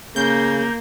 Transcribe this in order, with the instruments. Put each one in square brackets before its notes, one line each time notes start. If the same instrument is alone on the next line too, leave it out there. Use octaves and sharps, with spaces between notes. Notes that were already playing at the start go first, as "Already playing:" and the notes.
[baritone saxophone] C#3 [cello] A#3 [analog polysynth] G6